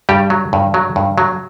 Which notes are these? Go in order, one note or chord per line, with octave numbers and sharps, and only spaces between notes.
G2 G3 G4
F#3
G2
F#3
G2
F#3